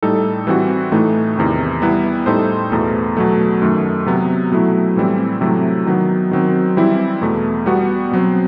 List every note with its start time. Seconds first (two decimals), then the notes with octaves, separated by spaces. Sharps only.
0.03 A2 G3 D#4 A4
0.47 E3 G3 C4 F#4
0.92 A2 E3 A3 D#4
1.37 E2 C3 D#3
1.82 G3 B3 E4 B4
2.26 A2 G3 D#4 A4 C5
2.72 E2 B2 A3
3.17 B2 F#3 A3
3.62 F#2 D#3 A3
4.06 C3 F#3 B3
4.51 B2 F#3 A3 E4
4.96 A2 E3 G3 C4 E4
5.41 C3 F#3 A3 E4
5.86 D#3 F#3 B3
6.31 D#3 F#3 C4
6.77 E3 G3 C4 E4
7.21 E2 B2 A3
7.66 G3 B3 F#4
8.11 B2 F#3 C4